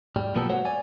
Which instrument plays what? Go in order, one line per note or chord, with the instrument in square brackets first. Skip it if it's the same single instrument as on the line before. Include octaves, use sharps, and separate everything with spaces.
[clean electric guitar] G#2 G3
B1 F3 A#3 B3 G4 A4
C2 G#3 F#4 C5 C#5 F#5
C#5 D5 G#5